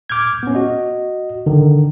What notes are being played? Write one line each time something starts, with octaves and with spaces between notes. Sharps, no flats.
D6 F6 G6 G#6
B3 C#4
F#4 D#5
D3 D#3